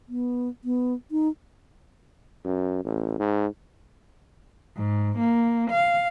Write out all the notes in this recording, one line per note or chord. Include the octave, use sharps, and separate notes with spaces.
B3
B3
D#4
F#2
A1
G#2
G#2
A#3
F5